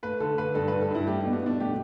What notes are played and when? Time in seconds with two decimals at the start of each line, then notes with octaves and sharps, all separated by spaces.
0.03 A3 B4
0.20 D3 A4
0.38 A3 B4
0.55 G2 A4
0.68 B4
0.72 G2
0.81 A4
0.90 G2 E4
1.07 A3 G4
1.25 B2
1.33 B3
1.43 B2 D4
1.60 A3 G4